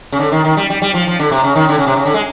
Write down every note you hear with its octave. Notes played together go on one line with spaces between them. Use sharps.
C#3
D3
D#3
D#3
G3
G3
G3
F3
F3
D3
C3
C#3
D#3
D3
C#3
C3
C#3
D3
G#3